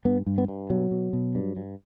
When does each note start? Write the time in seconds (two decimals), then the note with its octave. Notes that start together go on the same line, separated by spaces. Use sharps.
0.05 G2 B3
0.26 G2
0.38 B3
0.48 G2
0.70 B2 F#3
0.91 B2
1.13 B2
1.35 G2
1.57 G2